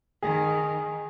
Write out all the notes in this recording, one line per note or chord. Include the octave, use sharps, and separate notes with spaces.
D#3 G#4